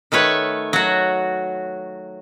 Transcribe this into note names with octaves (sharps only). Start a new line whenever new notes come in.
D#3 A3 B4 C#5
F#3 F#4